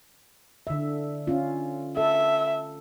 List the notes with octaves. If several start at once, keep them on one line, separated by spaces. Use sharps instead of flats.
D3 E5
C#4 F4
A4 E5